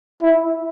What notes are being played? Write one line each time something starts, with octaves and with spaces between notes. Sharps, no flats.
E4